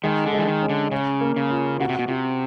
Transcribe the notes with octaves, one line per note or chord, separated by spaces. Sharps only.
D#3 G#3
D3
G#3
E3
D#3
C#4
D3
C#3 C#4
A#3
C#3
F4
C#3 F#4
C3
B2
C3 F#4